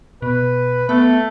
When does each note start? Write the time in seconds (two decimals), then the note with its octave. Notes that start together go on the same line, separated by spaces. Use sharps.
0.22 B2 B4
0.89 A3 B3